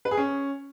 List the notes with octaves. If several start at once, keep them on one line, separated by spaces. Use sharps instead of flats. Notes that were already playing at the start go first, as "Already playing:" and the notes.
B4
G#4
C#4